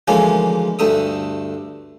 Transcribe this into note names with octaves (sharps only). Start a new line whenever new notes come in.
D2 E3 F3 G#3 A#3 C#4
D2 G2 A3 E5 D#6